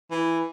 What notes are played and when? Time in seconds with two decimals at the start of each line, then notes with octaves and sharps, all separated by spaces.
0.11 E3